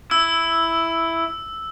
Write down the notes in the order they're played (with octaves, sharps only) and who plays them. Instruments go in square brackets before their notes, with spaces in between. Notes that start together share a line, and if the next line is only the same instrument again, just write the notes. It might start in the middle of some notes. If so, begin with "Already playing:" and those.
[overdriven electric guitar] E4 [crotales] E6